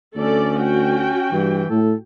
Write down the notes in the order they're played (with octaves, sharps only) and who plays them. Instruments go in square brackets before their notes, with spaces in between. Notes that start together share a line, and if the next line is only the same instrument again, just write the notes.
[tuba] D2 [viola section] A3 A4 D5 [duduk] C#4
[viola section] F#4 G5
[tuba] G2 [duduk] E3
[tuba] A2 [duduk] A4